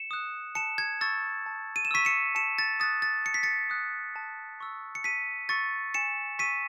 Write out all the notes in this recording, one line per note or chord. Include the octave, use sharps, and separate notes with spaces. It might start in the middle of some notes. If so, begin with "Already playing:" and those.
Already playing: C#7 E7
D#6 F#6
A5 C#7 E7
G#6
C#6 E6 A6
A5
D#7
E7
C#6 E6 B6 D#7
C#7 E7
A5 C#7 E7
A6
D#6 F#6 A6
A6
A5 C#7
B6
A6 C#7
D#6 F#6
A5
C#6 E6
C#7
A5 B6 D#7
C#6 E6 A6 C#7
G#5 C#7 E7
C#6 E6 B6 D#7